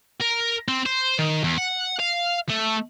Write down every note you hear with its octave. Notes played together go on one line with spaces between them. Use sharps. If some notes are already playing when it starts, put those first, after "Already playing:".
A#4
C4
C5
D#3
E2
F#5
F5
A3